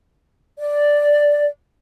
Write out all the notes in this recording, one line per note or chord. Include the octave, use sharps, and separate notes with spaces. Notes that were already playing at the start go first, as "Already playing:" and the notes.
D5